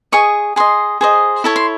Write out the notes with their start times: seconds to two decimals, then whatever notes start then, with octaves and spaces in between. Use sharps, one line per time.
0.12 G#4 D#5 C#6
0.56 G#4 D#5 C6
1.01 G#4 C5 D#5
1.44 E4 A4 C#5 A5
1.56 C6